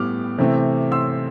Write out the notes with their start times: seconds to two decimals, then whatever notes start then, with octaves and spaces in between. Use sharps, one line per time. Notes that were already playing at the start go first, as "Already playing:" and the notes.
Already playing: A2 G3 B3 D6 F6
0.39 C3 E3 A3 C4
0.92 C6 E6